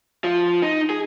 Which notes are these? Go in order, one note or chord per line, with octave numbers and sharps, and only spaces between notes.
F3
D#4
G#4